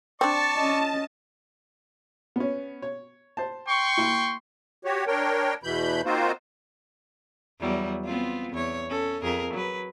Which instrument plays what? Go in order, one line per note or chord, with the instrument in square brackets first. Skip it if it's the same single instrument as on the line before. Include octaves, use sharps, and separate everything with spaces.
[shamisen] C4 D4 [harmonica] D5 C#6 [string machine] A5
[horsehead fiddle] C#4 D#5
[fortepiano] B3 C#4
C#5
C5 A5
[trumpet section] G5 C6 C#6
[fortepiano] A#3 E4
[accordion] F#4 G4 C#5
D4 A#4 C#5 G5
E2 B2 E3 B5 G6
A#3 C4 D#4 F4 F#4 C5
[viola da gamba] E2 F#3 G3
B3 C4 F4
E2 C#5
C#4 A4
F2 G#4 A#4
F#3 B4